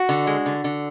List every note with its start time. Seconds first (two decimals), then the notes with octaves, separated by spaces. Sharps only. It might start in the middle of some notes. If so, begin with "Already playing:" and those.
Already playing: F#4
0.09 D3
0.27 G#3
0.46 D3
0.64 D3